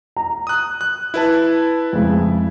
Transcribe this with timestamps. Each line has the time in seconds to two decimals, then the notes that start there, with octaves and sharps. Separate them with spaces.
0.17 A#5
0.47 D#6 F#6
0.81 F#6
1.14 E4 B4 A5
1.93 F2 C#3 G#3